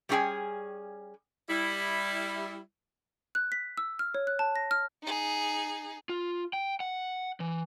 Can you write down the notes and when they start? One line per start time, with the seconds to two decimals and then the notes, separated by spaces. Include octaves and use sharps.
0.09 G3 A3 C#4 G#4 G5 G#5
1.49 G3 E4
3.35 F#6
3.52 B6
3.77 E6
3.99 F6
4.14 C#5
4.27 F#6
4.39 A5
4.56 A#6
4.71 F6
5.03 D#4 G#4
6.09 F4
6.53 G5
6.80 F#5
7.40 E3